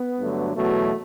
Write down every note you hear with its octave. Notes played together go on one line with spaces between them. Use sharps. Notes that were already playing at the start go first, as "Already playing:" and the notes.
Already playing: B3
G2 D3 F#3 A3
E2 B2 F#3 A3